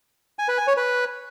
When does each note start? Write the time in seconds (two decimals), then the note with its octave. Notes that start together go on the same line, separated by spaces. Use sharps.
0.39 G#5
0.48 B4
0.58 G#5
0.67 C#5
0.77 B4